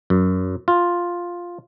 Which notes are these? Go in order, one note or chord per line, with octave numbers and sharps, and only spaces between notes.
F#2
F4